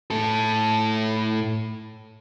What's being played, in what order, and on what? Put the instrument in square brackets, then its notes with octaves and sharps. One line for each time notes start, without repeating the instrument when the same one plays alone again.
[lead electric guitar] A2 A4